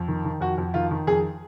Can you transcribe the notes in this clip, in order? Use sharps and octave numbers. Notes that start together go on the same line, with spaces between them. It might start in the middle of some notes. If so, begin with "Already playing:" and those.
Already playing: F2
D#3
D#3
F2 F#4
F2
D#3 F4
D#3
F2 G#4